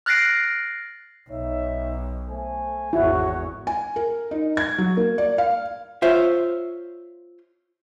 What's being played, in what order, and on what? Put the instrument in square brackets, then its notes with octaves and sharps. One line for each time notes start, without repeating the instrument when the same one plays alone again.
[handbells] F6 F#6 A6 A#6 C7 D7
[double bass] B1 [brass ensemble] D#4 C#5 E5
[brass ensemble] A3 C5 G#5
[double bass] G#1 E2 [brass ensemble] D3 G#4 C#5 [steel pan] E4 [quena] F#4
[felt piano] G#5
A#4
D#4
G#6
F#3
A#3
D5
F5
[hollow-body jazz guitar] F4 C5 C#5 E5